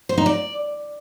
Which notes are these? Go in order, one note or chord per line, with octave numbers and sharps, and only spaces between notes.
C5
D#4
D5